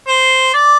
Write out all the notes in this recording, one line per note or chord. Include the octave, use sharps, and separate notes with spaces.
C5
D5